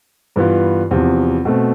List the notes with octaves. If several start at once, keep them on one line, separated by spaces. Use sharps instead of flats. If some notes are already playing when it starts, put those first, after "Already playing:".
G2 E3 B3 F4
E2 C3 F3
B2 A3 C4